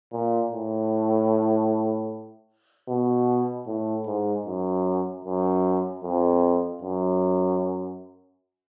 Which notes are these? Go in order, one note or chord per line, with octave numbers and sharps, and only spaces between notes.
A#2
A2
B2
A2
G#2
F#2
F#2
F2
F#2